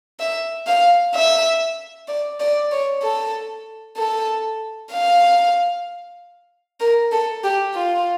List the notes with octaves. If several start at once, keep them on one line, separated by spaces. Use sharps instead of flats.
E5
F5
E5
D5
D5
C#5
A4
A4
F5
A#4
A4
G4
F4